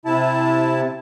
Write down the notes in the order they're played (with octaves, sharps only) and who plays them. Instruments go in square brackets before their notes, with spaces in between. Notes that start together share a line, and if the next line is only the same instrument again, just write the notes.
[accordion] C3 E4 A5